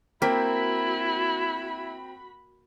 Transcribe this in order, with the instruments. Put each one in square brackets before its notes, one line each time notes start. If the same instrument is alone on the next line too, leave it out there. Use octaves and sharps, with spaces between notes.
[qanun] A#3 [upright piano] C4 G5 B6 [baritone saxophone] E4 [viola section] F#4 B5